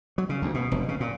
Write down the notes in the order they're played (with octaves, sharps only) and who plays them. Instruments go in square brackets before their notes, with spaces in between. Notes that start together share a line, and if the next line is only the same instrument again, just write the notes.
[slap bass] F#3
C#3
D2
B2
F1
C#3
A#2